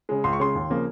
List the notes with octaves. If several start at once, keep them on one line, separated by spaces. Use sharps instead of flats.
C#3 G#3
C#2 C6
C#6
C#3 G#3 C6
D#2
C#3 F3 A#3